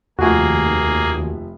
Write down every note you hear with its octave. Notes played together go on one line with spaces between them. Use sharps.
F1 D#2 F3 A#3 F#4 G#4 E5 G#5